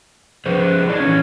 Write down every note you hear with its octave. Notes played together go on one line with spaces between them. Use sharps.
F3 G#4 B4 C5
D4 D#4 C#5
E3 C#4